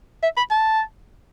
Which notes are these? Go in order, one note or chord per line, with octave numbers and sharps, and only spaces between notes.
E5
B5
A5